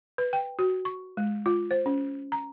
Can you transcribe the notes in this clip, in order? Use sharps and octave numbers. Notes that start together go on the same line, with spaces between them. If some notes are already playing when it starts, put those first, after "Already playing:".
B4
G5
F#4
C#6
G#3
F4
C5
C#4
A#5